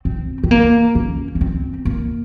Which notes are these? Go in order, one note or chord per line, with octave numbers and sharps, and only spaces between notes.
C4
C4
A#3
C#4
A#3
C4
A#3